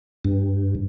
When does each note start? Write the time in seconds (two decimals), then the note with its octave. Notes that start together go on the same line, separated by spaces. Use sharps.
0.25 G2